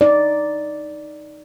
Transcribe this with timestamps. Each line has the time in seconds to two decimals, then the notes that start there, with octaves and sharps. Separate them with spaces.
0.01 D#4 D5